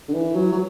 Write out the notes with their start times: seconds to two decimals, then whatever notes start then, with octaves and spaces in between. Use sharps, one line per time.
0.08 D3
0.14 E3
0.35 F#3
0.52 F#3